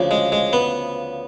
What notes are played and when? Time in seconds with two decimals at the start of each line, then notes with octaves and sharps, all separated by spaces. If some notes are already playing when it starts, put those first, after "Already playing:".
Already playing: D2 C#3 F3
0.11 G#3
0.32 G#3
0.53 B3